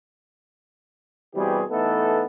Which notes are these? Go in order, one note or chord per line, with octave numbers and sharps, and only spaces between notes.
B2 E3 G3 C4 G4 G#4
E3 A3 B3 D#4 A4